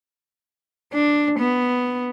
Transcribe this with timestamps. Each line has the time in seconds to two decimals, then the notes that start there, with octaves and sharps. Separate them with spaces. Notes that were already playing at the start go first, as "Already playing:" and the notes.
0.93 D4
1.39 B3